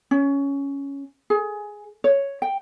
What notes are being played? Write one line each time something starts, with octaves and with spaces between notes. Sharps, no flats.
C#4
G#4
C#5
G5